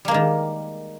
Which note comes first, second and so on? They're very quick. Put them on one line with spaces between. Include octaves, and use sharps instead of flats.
G3 A#3 G#3 D#3